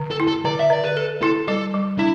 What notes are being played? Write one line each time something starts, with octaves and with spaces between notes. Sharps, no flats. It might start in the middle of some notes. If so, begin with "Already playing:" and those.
Already playing: D3
A4
E4
A4
D3 D5
E5
D3 D5
B4
A4 B4
E4 A4
G3 A4
G3
D4 E4